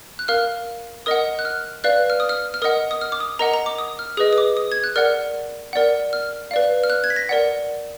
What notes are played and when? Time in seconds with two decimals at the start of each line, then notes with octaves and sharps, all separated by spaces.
0.19 F#6
0.28 A#4 F5 F6
1.06 A#4 D#5 F#5 D#6
1.39 F#6
1.45 F6
1.84 B4 D5 F5 F#6
2.10 F6
2.20 D#6
2.29 F6
2.54 F6
2.62 A#4 D#5 F#5 D#6
2.91 D#6
3.01 F6
3.12 D6
3.20 D#6
3.39 A#4 D#5 F#5 A#5
3.54 A#5
3.66 D6
3.78 D#6
3.99 F6
4.17 G#4 B4 D#5 D#6
4.33 D#6
4.38 D6
4.57 D#6
4.72 G#6
4.84 F#6
4.96 A#4 D5 F#5 F6
5.73 A#4 D5 F#5
6.13 F6
6.51 B4 D5 F5
6.84 F6
6.90 F#6
7.04 G#6
7.10 B6
7.16 A#6
7.29 A#4 D5 F#5